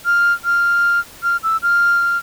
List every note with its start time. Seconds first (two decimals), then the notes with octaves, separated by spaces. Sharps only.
0.06 F6
0.45 F6
1.23 F6
1.43 E6
1.63 F6